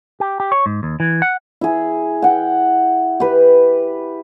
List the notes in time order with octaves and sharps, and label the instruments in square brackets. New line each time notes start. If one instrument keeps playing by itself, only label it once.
[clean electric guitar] G4
G4
C#5
G#2
D#2
E3
F#5
[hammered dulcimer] E4 G#4
F#5 G5
G4 B4